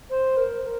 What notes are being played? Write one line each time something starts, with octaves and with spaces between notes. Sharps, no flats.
C5
A#4
A#4